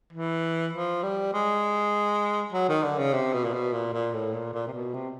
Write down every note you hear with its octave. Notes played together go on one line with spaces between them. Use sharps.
E3
F3
G3
G#3
F#3
D#3
D3
C#3
C3
B2
A#2
B2
A#2
A#2
A2
A#2
A#2
C3
B2
C3